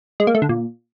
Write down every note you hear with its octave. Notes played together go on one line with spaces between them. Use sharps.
G#3
A#3
A3
D3
A#2